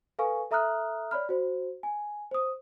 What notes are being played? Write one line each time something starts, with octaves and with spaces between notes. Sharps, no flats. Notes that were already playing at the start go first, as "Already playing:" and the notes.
A4 B4 F5 G#5 C#6
A4 E5 A#5 D#6 F6 F#6
C#5 D5 B5 F6
F#4 C5
G#5
C5 D#6